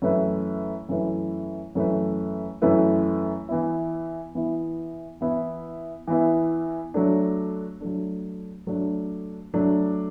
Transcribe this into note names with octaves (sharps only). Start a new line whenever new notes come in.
F#2 E3 A3 E4 B4
F#2 E3 A3 E4 B4
F#2 E3 A3 E4 B4
F#2 E3 A3 E4 B4
E3 B3 E4
E3 B3 E4
E3 B3 E4
E3 B3 E4
F#3 A3 D4
F#3 A3 D4
F#3 A3 D4
F#3 A3 D4